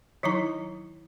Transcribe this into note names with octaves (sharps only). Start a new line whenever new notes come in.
D#3 F#3 D#4 E4 A#5